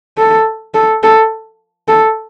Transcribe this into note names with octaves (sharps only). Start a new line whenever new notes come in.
A4
A4
A4
A4